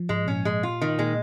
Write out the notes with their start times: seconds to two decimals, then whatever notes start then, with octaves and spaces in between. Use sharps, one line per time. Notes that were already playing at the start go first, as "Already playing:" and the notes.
Already playing: F3
0.09 G#2 G#3
0.27 A#2 C#4
0.45 G#3
0.63 F4
0.81 D#3
0.99 A#2 G#3